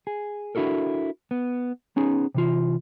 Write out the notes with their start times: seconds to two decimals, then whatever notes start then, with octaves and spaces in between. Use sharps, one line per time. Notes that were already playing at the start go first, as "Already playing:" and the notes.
0.07 G#4
0.55 D4 E4 F#4 A4 A#4
1.31 B3
1.96 B3 C#4 D#4 G#4
2.35 C3 E3 F4